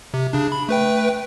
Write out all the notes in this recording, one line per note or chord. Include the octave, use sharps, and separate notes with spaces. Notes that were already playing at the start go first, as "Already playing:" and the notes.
C3
C#3 D4
B5
A3 B4 G5